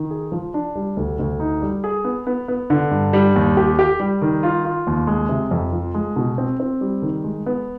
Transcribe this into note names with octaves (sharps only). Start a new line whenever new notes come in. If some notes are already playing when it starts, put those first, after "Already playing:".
Already playing: D#3
G#4
F3
D4
G3
D2
D2
D#4
G3
G#4
B3
B3
B3
D3
G2
G3
D#2
G4
G4
G3
D#3
F4
F4
D#2
G#3
C3
F2
F3
G#3
B2
C4
C4
G3
D#3
G#3
B3